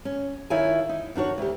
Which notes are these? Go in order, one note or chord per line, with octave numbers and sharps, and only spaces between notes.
C#4
D#3 E4 F4 C#5 G#5
D#4
D#3 D4 F#4 C#5
D2 G4